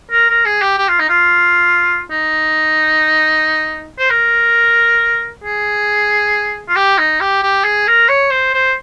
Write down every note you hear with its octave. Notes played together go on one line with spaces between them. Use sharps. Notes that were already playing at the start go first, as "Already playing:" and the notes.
A#4
A#4
G#4
G4
G4
F4
D#4
F4
D#4
C5
A#4
G#4
F4
G4
D#4
G4
G4
G#4
A#4
C#5
C5
C5